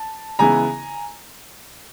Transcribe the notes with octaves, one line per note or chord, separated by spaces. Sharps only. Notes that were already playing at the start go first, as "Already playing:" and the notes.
Already playing: A5
C#3 E3 G#3 B3 E4 G#5 A#5